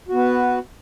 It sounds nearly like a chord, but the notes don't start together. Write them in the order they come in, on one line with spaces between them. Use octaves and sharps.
F#4 B3 B4